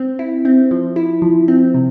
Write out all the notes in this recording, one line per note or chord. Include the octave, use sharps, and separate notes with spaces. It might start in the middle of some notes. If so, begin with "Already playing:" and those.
Already playing: C4
E4
C4
F3
E4
F3
C4
C3